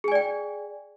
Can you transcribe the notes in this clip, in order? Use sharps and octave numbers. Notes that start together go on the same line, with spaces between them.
G#4 D5 G5 G#5